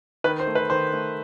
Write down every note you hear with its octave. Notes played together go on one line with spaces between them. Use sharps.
D#3 B4
C5
A3
B4
D#3 C5
A3